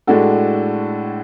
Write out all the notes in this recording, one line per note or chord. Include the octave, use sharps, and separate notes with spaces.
A2 G#3 D4 F#4 A4